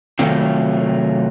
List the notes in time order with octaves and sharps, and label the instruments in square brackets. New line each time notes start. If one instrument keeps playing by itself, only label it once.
[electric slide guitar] C3 D#3 F#3 A3 C4 F4